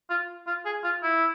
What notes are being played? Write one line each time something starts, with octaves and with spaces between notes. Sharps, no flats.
F4
F4
G#4
F4
E4